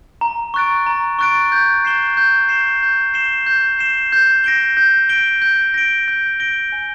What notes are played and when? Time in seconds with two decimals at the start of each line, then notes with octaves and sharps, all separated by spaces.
0.21 A#5
0.54 C#6 F#6 A6 D7
0.86 A#5
1.19 C#6 F#6 A6 D7
1.52 G6
1.85 C7 E7 G7
2.17 G6
2.49 C7 E7 G7
2.82 G6
3.14 C7 E7 G7
3.47 G6
3.79 C7 E7 G7
4.12 G6
4.44 A#6 D7 G7
4.77 G6
5.09 A#6 D7 G7
5.42 G6
5.74 A#6 D7 G7
6.08 G6
6.40 A#6 D7 G7
6.72 G#5